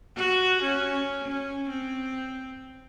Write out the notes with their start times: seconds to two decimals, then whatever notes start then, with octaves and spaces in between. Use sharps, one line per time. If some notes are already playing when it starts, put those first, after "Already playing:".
0.17 F#4
0.63 C#4
1.28 C#4
1.69 C4